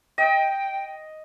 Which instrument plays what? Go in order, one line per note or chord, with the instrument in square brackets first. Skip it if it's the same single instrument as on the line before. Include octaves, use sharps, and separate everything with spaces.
[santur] D#5 [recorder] G5